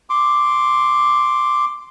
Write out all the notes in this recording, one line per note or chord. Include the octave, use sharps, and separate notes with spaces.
C6 D6